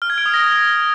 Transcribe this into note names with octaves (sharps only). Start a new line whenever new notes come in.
F6
G#6
D7
D#6
A#6